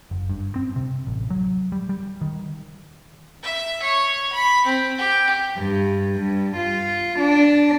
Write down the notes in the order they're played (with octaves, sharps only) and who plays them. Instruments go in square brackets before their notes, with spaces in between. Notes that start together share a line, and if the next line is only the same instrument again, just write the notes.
[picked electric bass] F#1
G2
C4
C3
A1
F#3
G3
G3
D#3
[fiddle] E5
C#5
B5
C4
G4
[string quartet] G2
G2
F4
D4